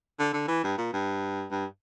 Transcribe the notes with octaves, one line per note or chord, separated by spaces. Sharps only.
D3
D3
E3
G2
A#2
G2
G2